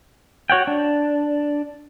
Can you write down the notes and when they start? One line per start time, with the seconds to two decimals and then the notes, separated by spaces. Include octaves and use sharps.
0.50 F#4 C#5 F#5 G5
0.67 D4